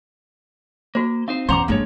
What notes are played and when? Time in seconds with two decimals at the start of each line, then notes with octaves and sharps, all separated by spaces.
0.95 A#3 F#4 C5
1.28 C4 D#4 C5 F5
1.49 E2 C#4 C5 F#5 A#5 C6 D6
1.68 F3 G#3 A#3 D4 C#5